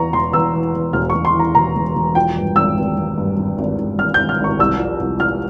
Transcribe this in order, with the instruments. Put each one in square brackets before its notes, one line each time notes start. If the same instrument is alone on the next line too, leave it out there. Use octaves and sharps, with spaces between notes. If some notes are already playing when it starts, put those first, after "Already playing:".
Already playing: [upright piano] E2 E3 A#5 C#6
E1 C6
E2 E6
E3
E2
E1 F6
E1 C#6
C6
E3
A#5
E1 A#5
E1
E1
F3 G5
G2
G#1 E6
G#1
G#1
G2
G#1
G#1
G#1
G#1 F6
G#1 G6
F6
G#1 C#6
C2 E6
F3
C2
F3 F6